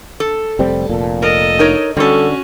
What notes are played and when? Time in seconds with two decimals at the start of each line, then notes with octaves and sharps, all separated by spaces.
0.20 A4
0.59 F1 G3 C4
0.89 F1 A#2
1.22 A4 A#4 D#5
1.59 D#4 A#4 C#5
1.97 D3 G3 C#4 F#4 A4